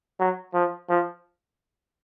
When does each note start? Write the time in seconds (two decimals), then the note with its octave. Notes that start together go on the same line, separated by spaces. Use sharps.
0.19 F#3
0.54 F3
0.90 F3